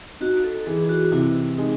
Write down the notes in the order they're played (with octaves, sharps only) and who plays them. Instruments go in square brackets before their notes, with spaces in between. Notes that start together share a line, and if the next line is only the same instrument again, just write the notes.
[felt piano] D#4 [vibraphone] F#4
[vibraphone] A4
[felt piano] E3 [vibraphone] G#4
[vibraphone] G#4
F#4
[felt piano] C3 [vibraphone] E4
[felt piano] G#3 [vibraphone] D#4